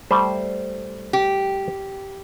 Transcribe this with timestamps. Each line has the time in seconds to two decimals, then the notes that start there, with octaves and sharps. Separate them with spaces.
0.11 G3 A3 C5
1.13 G4